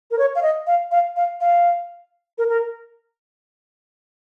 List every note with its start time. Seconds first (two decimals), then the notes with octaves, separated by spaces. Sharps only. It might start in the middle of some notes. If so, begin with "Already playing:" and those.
0.11 A#4
0.19 C#5
0.35 F5
0.43 D#5
0.67 F5
0.91 F5
1.17 F5
1.41 F5
2.38 A#4
2.49 A#4